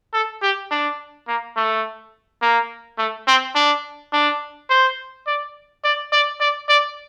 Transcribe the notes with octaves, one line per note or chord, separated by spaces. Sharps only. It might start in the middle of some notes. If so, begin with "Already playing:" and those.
A4
G4
D4
A#3
A3
A#3
A3
C4
D4
D4
C5
D5
D5
D5
D5
D5